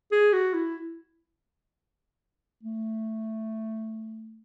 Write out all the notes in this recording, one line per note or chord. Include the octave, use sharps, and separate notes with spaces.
G#4
F#4
E4
A3